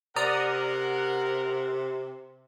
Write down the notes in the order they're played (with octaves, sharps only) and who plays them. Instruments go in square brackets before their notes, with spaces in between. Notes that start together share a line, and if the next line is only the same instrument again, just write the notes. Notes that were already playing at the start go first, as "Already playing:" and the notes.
[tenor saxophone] C3 [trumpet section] A#4 F#5 [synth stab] D5 A#5 D#6